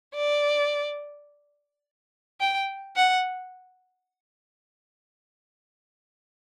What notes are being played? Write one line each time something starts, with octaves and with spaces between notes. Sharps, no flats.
D5
G5
F#5